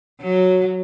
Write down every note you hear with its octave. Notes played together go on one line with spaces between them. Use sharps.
F#3